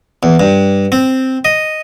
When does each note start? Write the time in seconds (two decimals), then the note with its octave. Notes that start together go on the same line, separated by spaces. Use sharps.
0.23 E2
0.40 G2
0.92 C4
1.45 D#5